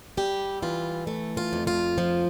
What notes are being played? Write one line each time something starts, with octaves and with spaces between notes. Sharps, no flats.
G3 G4
E3 F4
A3
F4
F2
F4
F3